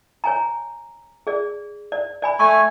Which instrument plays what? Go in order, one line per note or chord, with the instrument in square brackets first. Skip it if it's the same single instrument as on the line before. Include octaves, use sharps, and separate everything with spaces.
[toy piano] C#5 G#5 A#5
G#4 D5
D5
D5 G#5 B5
[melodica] A3 G#5 [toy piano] C6 C#6